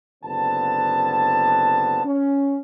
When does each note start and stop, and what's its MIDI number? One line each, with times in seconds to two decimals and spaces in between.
0.24 2.03 30
0.24 2.03 50
0.24 2.03 59
0.24 2.03 60
0.24 2.03 81
2.05 2.58 61